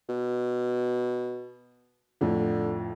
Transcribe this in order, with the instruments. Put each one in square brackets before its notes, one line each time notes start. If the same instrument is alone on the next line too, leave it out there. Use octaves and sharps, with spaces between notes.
[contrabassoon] B2
[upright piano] F2 A2 [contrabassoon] D3